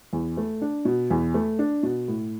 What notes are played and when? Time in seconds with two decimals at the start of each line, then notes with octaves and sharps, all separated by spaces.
0.13 E2
0.37 A3
0.62 D4
0.85 B2
1.11 E2
1.34 A3
1.59 D4
1.83 B2
2.08 A2